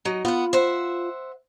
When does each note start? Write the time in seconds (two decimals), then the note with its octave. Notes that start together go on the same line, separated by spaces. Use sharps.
0.05 F#3 D#4
0.25 B3 F4 F#5
0.53 C5 E5 F#5